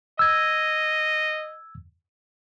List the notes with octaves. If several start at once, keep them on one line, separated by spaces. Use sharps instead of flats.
D#5 E6 G#6